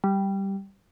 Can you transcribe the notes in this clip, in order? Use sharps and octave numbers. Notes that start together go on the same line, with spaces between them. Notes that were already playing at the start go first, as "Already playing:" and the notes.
G3